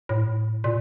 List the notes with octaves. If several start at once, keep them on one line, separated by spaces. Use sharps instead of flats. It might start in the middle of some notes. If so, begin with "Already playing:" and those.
A2
A#2